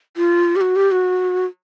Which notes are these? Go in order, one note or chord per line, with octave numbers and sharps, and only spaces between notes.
F4
G4
F#4
G4
F#4